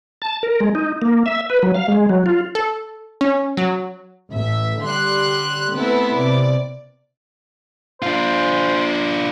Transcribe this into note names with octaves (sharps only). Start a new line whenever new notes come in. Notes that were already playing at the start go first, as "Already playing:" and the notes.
A5
A#4
G#3
D#4
A#3
E5
B4
F#3
F5
G#3
F#3
F4
A4
C#4
F#3
A1 E5
D3 G3 C6 F#6
A3 B3 C4 E4 A4
C3 D5
D4 F4 C5